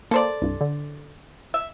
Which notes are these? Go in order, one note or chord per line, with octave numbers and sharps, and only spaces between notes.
A#3 A4 C5 D5
C2 G2
D3
E5